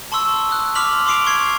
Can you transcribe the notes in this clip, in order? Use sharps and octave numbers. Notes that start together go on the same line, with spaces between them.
A5 C6 C#6 E6
D#6 F#6
C6 D6 F6 B6 F7 F#7
C6 D6 D#6 C7 D7 F7
C#6 G#6 C7